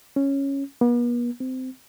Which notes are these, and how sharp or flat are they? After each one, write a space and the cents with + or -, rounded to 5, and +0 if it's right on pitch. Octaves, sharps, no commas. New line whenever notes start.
C#4 -5
B3 -45
C4 -20